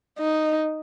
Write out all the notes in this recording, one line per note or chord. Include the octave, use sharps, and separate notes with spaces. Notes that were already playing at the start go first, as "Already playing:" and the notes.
D#4